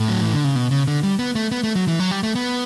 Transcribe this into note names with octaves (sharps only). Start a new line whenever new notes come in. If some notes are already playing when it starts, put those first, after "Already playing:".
Already playing: A2
F#3
E3
D3
C#3
B2
C#3
D3
G3
B3
A3
B3
A3
F#3
E3
F#3
G3
A3
B3